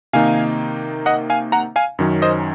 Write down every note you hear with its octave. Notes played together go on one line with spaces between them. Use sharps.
C3 D#3 A#3 D#4 F5 G#5
D#5 F#5
F5 G#5
F#5 A#5
F5 G#5
F#2 D#3 F#3 C#4
C5 D#5